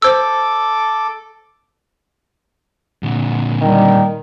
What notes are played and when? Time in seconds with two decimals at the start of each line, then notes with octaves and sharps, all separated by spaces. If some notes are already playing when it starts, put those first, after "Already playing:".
0.02 A4 C5 D6 E6
3.03 A#2 D3
3.61 D#3 G3